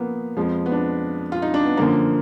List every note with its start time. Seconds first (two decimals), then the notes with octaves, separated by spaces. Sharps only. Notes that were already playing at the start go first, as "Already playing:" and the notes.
Already playing: F3 A#3 B3
0.37 F2 F3 G#3
0.66 B3
0.71 D4
1.32 F4
1.42 D#4
1.54 D4
1.65 B3
1.77 F#2 D3 F3 A#3